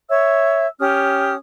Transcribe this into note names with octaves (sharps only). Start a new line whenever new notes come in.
C#5 E5 E6
C#4 G4 D#6 F6